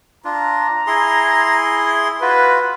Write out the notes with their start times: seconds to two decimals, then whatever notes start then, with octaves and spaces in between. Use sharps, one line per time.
0.25 D4 F4 A#5
0.87 E4 G#4 C6
2.22 F4 F#4 B4